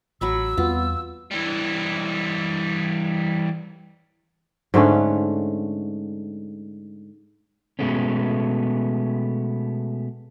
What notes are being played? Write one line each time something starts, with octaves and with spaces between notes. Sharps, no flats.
A1 F#3 B5 C#6 E6
E2 G3 B3 C4 F4
E3 G3
G#2 D3 A3 C#4
B2 G#3 A3 B3 C#4